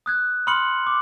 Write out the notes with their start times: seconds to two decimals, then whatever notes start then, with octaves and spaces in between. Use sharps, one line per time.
0.06 D#6 F#6 G#6
0.47 B5 C6 D#6 F6 C#7 F#7
0.87 D6